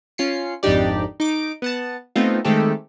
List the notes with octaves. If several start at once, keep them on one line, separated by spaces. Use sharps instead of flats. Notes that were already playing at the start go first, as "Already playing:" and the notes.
C#4 F4 C7 C#7
G#1 F2 D4 D#4 G4 D5
D#4 D6 D7
B3 F#5 A5
A3 B3 C4 D#4 F4
D#3 G#3 A3 C4 G4 A4